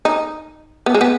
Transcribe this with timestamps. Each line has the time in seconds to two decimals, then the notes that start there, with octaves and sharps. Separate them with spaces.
0.05 D#4
0.86 B3
0.94 G#3
1.01 B3